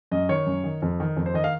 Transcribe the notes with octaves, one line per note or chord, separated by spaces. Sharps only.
F#2 D#5
D#3 C#5
F#2
D#3
F2
D#3
F2
C5
D#3 D#5
F5